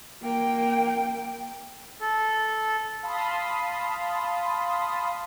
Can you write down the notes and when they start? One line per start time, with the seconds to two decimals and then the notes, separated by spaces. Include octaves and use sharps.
0.22 A#3 G5
2.01 A4
3.03 F5 A5 B5 C6 D#6